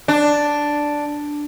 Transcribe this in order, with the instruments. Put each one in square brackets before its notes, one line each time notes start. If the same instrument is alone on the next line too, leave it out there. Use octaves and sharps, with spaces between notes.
[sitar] D4